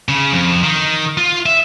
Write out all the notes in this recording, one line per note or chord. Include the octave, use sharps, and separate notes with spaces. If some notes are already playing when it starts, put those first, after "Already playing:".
C#3
F2
D#3
F4
E5